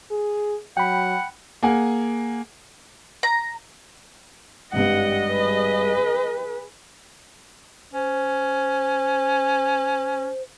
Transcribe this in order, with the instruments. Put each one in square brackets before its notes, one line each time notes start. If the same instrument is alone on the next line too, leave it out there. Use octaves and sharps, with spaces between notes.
[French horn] G#4
[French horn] F#3 [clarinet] F#5 [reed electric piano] G5 B5
[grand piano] A#3 G#4 F#5 G#5
[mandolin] A#5
[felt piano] G#1 G2 [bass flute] G3 [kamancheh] D#5 [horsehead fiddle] F#5
[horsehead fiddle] G#4 B4
[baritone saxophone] C#4 [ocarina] C5